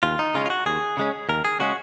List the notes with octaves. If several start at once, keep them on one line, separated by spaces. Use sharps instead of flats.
D#2 F4
D#4
C#3 G#3 C#4 F4
F4
F#4
D#2 G#4
C#3 G#3 C#4
D#2 A#4
G#4
C#3 G#3 C#4 F#4